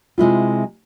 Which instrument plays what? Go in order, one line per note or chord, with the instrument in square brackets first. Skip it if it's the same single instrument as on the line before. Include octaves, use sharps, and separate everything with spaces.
[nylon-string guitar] C3 G#3 E4 F4